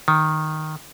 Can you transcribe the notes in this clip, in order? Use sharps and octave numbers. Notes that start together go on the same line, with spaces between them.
D#3